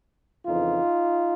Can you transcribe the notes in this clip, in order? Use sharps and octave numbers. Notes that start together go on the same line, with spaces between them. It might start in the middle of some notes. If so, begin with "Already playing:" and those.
F2 C#3 E3 D#4 F4